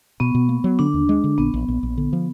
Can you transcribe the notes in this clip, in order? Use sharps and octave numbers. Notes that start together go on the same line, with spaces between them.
B2 B3
B2
A#3
F#3
D3 D4
D#2
G#3
D3
A#1 B3
A#1
A#1
A#1
D3
F3